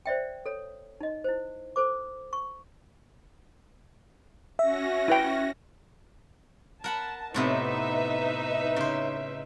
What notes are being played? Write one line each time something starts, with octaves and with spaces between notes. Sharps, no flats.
C5 D5 E5 G5
A4 C#5
D#4 D#5
E4 C5
A4 C5 D6
C#6
C#4 F#4 E5 A#6
E4 B4 G5
A#4 F#5 A5 B5
A2 C3 B3 D#4 B4 E5
C#3 C5